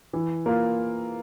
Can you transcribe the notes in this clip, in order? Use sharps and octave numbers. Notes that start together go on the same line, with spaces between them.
E3
A#3 F4